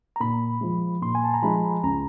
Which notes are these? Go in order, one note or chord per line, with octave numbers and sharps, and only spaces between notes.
A#5
A#2 B5
F3 G#3
A#2 C6
G#5
A5
A#5
F3 G#3 B5
C#2 A#5